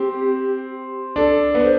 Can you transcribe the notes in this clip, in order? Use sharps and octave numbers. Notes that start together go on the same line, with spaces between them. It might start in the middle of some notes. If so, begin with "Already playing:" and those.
Already playing: C4 G4
D4 A4
B3 B4
C5